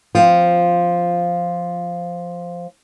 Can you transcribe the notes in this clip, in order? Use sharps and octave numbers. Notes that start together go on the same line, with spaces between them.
F3 C4 F4